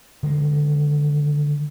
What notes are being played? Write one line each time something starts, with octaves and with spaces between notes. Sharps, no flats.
D3 D#3 G#3